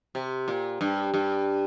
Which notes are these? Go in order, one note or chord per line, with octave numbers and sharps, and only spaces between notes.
C3
A#2
G2
G2